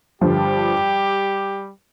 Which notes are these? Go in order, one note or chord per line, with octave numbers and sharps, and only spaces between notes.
G2 D3 F3 G3 G4